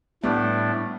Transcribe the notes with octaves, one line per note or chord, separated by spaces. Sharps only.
A2 G3 A3 B3 D4